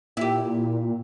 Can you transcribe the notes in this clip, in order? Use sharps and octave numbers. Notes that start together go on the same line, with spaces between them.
A#2 E4 G4